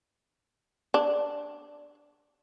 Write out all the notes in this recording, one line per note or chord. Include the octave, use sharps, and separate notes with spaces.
D4